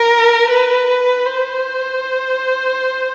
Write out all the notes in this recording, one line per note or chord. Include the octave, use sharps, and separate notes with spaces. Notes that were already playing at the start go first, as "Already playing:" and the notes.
Already playing: A#4
B4
C5